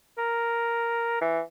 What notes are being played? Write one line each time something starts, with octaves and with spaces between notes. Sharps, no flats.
A#4
E3